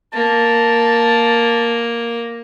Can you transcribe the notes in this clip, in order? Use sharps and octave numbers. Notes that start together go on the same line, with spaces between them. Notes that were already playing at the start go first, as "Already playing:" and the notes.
A#3 A5